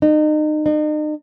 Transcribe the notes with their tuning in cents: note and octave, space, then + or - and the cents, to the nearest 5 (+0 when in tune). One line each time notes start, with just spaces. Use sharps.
D#4 -30
D#4 -40